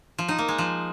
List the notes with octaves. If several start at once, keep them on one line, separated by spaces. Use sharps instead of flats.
F3
D#4
A#3
G#3
F3